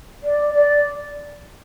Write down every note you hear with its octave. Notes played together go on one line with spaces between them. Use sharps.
D5
D5